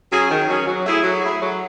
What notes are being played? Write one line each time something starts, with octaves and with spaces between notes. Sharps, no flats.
F#3 C#4 G#4
D#3
F#3 C#4 G#4
F#3
A3 E4 G#4
F#3
A3 E4 G#4
F#3